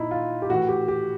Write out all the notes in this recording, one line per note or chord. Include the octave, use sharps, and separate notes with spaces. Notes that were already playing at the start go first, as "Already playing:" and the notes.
Already playing: A#2 D#4 E4
F4
G4
A2 E3 F#4
G4
G4